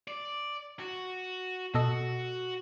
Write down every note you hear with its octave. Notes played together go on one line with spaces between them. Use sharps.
D5
F#4
B2 F#4 A4 D#5